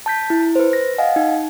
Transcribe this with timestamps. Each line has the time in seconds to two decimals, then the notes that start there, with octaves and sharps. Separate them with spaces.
0.06 A5 G6 B6
0.30 E4
0.56 B4 C5
0.73 A#6
0.98 D#5 F5 F#5 G#5
1.16 D#4